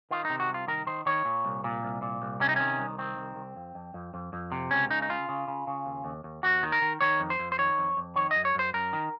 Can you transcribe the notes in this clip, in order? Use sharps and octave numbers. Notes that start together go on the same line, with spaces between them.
D#3 F4
D#4
C3
F#4
C2
F4
D#3 A#4
D#3 C5
D#3 C#5
A#2
C2
A#2
C2
A#2
C2
C3 C#4
D#4
D#3 C#4
C2
D#3 C4
C2
C2
F2
F2
F2
F2
F2
C3
C#2 C#4
C#3 D#4
D#4
C#3 F4
C#3
C#3
C#3
D#2
D#2
D#2
D#2 F#4
D#3
A#4
D#3
D#3 C#5
F2
C5
F2
C5
D#3 C#5
F2
F2
D#3 C#5
F#2 D#5
C#5
F#2 C5
F#2 A#4
D#3